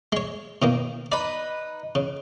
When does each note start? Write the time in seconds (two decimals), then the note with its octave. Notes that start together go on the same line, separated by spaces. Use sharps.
0.12 G#3 C#5
0.62 B2 D#3 A#3
1.12 D#4 B4 D5
1.95 C#3